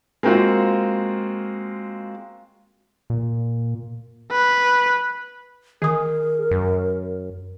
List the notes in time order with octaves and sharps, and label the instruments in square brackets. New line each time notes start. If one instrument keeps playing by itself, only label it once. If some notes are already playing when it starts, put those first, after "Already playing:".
[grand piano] G#3 A#3 C4 F4 F#4
[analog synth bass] A#2
[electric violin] B4
[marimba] D#3 D#6 [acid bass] G#4 [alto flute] A#4
[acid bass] F#2